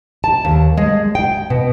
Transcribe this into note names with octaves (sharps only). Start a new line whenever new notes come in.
A5
D#2
G#3
G5
B2